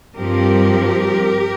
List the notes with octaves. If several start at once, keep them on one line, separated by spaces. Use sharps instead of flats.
G2 F3 C4 G4 A#4